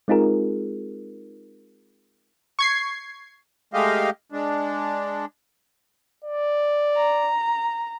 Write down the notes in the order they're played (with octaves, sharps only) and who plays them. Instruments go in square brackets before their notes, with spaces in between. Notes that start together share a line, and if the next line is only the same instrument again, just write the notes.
[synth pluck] G#3 C4 D#4 F4 G#4 A#4
[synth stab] C#6 G#6 C7
[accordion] G#3 A3 G4 D#5 F5
G#3 D4
[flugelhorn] D5
[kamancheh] A#5